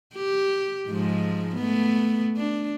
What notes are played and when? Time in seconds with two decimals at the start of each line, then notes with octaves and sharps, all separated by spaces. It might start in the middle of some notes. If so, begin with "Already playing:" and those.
0.14 G4
0.88 G#2 F3 G#3
1.55 A3 B3
2.37 D4